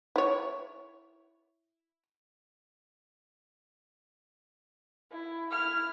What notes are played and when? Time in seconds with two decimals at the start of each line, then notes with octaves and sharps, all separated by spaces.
0.16 E4 C#5
5.12 E4
5.50 E4 F6